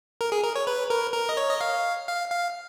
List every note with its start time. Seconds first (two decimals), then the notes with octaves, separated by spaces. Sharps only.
0.21 A#4
0.32 G#4
0.44 A#4
0.55 C#5
0.67 B4
0.90 A#4
1.14 A#4
1.29 D#5
1.37 C#5
1.50 D#5
1.61 F5
2.07 F5
2.30 F5